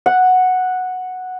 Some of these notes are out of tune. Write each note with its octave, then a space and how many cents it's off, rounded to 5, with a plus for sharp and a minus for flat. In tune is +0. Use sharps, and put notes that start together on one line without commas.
F#5 -5